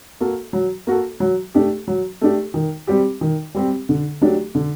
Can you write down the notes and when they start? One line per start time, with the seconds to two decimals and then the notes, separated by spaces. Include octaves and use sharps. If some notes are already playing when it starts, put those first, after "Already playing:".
0.21 A#3 F#4 A4
0.53 F#3
0.87 A#3 F#4 A4
1.20 F#3
1.54 A3 D4 G4
1.88 F#3
2.21 A3 D4 G4
2.54 D#3
2.87 G3 C4 G4
3.21 D#3
3.54 G3 C4 G4
3.89 D3
4.21 F#3 A3 D4 G4
4.55 D3